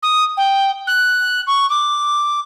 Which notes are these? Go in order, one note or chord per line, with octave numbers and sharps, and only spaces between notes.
D#6
G5
F#6
C#6
D6